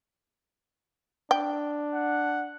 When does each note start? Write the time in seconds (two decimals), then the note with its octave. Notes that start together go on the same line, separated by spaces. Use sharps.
1.31 D4 G5
1.94 F#5